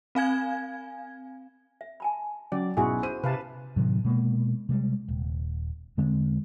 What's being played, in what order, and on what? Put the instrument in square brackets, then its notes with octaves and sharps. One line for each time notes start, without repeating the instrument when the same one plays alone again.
[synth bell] C4 F5 G#5 G#6
[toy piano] E5
G#5 A5 B5
[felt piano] F#3 [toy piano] C#4 [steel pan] D5
[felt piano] B1 [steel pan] E4 F#4 G#4 [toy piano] G#5 C6
[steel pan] C5 [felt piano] D#7
[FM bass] C3 [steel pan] B4 F5 A5
[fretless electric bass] A2 C3 D#3 F#3
B2 G#3 A#3
C3 G3 G#3
D#1
E2 D3 G#3 C4